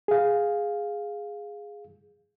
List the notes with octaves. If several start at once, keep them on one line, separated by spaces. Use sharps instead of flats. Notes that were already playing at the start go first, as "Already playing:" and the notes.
G#4 F5